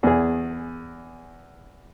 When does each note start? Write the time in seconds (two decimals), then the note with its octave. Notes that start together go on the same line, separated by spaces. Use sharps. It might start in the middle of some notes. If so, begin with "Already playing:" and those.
0.03 E2 G#4